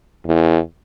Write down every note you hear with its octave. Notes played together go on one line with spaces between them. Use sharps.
E2